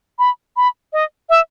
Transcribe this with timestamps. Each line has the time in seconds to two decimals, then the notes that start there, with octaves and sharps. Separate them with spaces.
0.19 B5
0.57 B5
0.93 D#5
1.29 E5